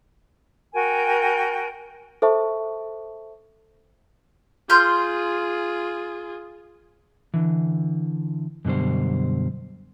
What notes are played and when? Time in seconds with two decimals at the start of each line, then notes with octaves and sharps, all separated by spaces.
0.74 F#4 A#4 G5 G#5
2.22 A4 C5 E5 A5 C#6
4.70 F4 G#4 C6 F6 G6
7.34 D3 E3
8.65 F#2 B2 D3 G3 C5